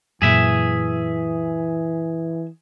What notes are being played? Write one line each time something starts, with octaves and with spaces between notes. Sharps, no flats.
F#2 A#2 E3 G#4 E5